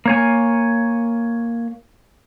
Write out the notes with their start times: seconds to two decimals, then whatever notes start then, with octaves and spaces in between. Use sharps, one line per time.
0.05 A#3 C#5 G#5